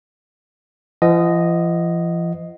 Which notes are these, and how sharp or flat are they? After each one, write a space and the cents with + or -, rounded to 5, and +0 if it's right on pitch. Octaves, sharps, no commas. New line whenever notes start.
F3 -45 D#5 +0 F#5 +0